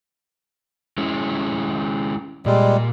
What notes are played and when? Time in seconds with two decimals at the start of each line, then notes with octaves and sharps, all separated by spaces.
0.98 G#3 C#4 E4
2.46 A#2 G3 G#3